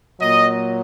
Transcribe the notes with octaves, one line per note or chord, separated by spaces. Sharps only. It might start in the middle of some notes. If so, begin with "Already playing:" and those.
A#2 F#3 D#5